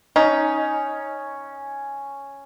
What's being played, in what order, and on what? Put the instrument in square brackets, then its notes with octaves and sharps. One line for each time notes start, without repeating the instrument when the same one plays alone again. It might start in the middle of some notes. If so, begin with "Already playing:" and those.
[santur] C#4 [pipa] D#4